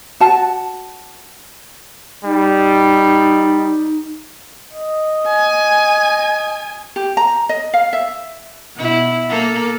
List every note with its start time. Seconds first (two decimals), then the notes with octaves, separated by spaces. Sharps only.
0.20 F#4 A5
2.25 G3 D#4
4.73 D#5
5.27 G#5
6.96 G4
7.17 A#5
7.49 D#5
7.74 F5
7.93 E5
8.76 B2 E4
9.29 A#3 A4